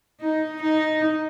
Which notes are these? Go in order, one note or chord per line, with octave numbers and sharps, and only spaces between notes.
D#4
D#4